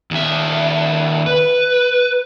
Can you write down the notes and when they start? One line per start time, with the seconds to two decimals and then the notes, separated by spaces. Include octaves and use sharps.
0.11 D#2 E5
1.26 B4